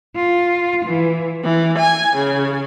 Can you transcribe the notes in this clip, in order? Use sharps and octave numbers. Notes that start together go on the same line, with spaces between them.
F4
E3
E3
G#5
C#3